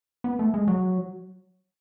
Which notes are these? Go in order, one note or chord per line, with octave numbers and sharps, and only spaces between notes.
B3
A3
G#3
F#3